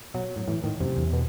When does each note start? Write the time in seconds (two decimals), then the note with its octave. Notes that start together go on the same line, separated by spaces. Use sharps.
0.14 B2 F#3
0.36 A2
0.48 A2 E3
0.64 A2 D#3
0.80 F#2 C3
0.97 E2
1.13 B2